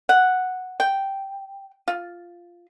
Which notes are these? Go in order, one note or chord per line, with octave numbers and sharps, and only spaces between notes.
F#5
G5
F4